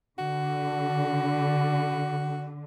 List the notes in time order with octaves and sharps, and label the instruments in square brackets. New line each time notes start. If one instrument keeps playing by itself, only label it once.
[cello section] D3 [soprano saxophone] F#4